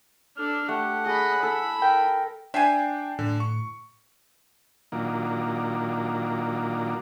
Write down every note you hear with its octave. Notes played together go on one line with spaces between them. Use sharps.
D4 A4 F6
A3 G4 F#5
G#4 D#5 B5
E4 A4 B5
A#4 G5
D4 E5 G5 G#5 C7
A2 D3
C#6
A#2 D#3 F#3 A#3 D4 F4